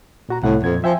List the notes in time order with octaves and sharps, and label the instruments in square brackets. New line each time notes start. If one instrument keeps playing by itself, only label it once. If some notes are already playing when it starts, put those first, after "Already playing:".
[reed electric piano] A#2 F#4 A#5
[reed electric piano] C2 C3 F#5 [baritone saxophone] A2
[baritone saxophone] F2 [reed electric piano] A#2 G#6
[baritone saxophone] F3 [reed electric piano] E5 G5 G#5